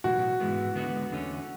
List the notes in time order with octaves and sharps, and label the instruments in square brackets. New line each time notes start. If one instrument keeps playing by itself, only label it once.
[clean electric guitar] B1 A2 E3 [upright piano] F#4
[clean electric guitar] G#2 E3 G#3 B3
D2 D3 G#3 B3 F#4
E2 D3 A3 C#4